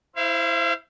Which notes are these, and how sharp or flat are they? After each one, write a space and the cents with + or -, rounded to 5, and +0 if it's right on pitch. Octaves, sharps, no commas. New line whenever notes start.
E4 +0 C5 +0 F5 -40